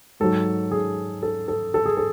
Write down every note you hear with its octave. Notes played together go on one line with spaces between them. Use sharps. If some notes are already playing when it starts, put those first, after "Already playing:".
G#2 F#3 A4
G#4
A4
A4
A4
G#4
A4